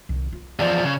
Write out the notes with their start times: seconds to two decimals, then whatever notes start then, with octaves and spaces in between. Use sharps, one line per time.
0.09 C2 D#3
0.32 F4
0.59 E2 F3 D5
0.84 C#3